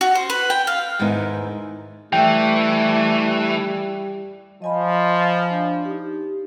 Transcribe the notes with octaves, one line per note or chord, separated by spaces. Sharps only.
F#4
C5
B4
G5
F5
E2 G#2 D#3 E3 B3 D#4
E3 G3 A3 G5
F3 D#5 G#5 B5
D4 D5
D#4 G4